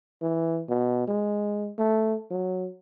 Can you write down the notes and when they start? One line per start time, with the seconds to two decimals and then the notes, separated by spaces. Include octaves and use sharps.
0.22 E3
0.69 B2
1.08 G#3
1.78 A3
2.31 F#3